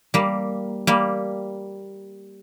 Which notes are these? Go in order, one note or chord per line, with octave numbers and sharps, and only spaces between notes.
G3 A#3
G3 A#3